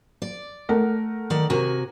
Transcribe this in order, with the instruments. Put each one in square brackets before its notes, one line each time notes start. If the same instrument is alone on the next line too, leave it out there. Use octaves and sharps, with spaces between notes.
[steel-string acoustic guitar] D5
[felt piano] A3 A#4 F#5
[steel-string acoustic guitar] D#3 D5
[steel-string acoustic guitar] C3 F#4 G#5 [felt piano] A#4